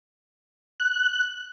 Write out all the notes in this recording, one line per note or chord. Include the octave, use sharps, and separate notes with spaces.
F#6